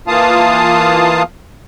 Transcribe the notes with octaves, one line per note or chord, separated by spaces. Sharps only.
E3 A#3 F4 F5 A5 D#6